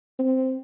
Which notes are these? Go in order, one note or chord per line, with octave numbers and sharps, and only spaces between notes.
C4